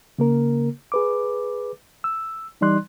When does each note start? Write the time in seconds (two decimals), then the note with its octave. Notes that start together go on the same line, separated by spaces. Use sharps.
0.19 C#3 A#3 A#4
0.92 G#4 B4 D6
2.04 E6
2.61 E3 G3 D#4 D5 C6 F#6